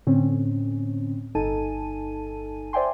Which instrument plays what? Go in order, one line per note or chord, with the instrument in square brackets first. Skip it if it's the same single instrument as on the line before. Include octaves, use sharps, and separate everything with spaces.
[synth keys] A2 D3 C4 C#4
G1 D#4 A4 G#5 A5 D#7
C5 D5 E5 G5 G#5 C6